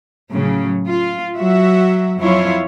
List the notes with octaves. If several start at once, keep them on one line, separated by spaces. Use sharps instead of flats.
A2 C#3 F#3
F4
F#3 F#4 E5
F2 F#3 E4 F4 C#5